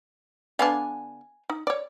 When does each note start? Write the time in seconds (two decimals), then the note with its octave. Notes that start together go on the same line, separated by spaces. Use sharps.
0.59 D3 B3 D4 F5 G#5
1.50 D#4
1.67 C#5 D5